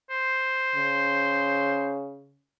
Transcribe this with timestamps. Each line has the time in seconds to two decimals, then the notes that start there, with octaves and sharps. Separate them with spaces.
0.10 C5
0.75 C#3